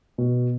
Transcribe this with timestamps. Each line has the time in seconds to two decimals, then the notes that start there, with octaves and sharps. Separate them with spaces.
0.18 B2